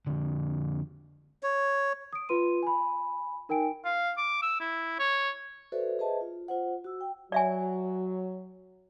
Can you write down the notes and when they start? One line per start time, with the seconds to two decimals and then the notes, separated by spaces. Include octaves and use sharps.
0.06 F2 D3
1.43 C#5
2.13 D#6 D7
2.29 F4 B4 C6 D#7
2.63 G#5 B5
3.49 D#4 A#4 G5 G#5 D7
3.85 F5
4.18 D6
4.42 E6
4.60 E4
5.00 C#5
5.72 F#4 A4 B4 C5 D5 E5
5.99 G#4 B4 C5 D#5 E5 A5
6.21 F4
6.48 F4 C5 F#5
6.84 F#4 E6
7.01 G5
7.32 F#3 D5 E5 G#5